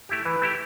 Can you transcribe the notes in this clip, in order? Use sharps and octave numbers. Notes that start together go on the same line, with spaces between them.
A3 E4 G4
E3 B4
A3 E4 G4